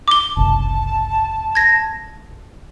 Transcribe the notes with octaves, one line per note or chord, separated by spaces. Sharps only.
D6 G7
F#1 C2 A5
G#6 A#6